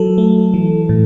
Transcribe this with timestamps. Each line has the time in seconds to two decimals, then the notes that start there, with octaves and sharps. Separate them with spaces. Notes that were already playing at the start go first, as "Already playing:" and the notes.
Already playing: F#3 A4
0.18 A3
0.54 E3
0.89 A2